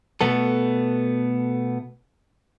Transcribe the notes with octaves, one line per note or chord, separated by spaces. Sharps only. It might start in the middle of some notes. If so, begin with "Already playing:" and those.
B2 A3 B3 A4